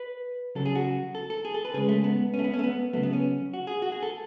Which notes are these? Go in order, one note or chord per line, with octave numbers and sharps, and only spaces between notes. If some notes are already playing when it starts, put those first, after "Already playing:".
Already playing: B4
C#3 F#3 A4
G#4
F#4
A4
A4
G#4
A4
B4
C#3 G#3 G#4
A3
B3
C#4
A3
B3
C#4
A3
B3
C#3 F#3 A3
B3
C#4
F#4
G#4
F#4
G#4
A4